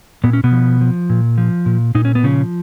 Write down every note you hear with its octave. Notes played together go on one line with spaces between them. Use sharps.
A#2 B3
C#4
B2 B3
F3
F3
A#2
F3
A#2
A#2 D#4
C#4
B3
C#3 F3 C#4